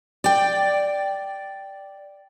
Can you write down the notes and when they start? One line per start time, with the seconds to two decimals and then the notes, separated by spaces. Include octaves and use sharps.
0.24 D5 G5